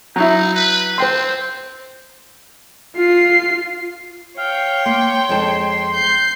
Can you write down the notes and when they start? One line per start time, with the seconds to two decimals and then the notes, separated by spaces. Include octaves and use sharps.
0.16 F#3 D#4 E4
0.55 B4
0.98 C4 C5 G5 C6
2.96 F4 C7
4.38 C#5 F5 G5
4.86 A#3 C6
5.29 F2 G#3 A5
5.94 G6 C7